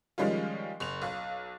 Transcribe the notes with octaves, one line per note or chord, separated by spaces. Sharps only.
D#3 F3 G3 G#3 C#4 F4
F#1 F7
B1 F5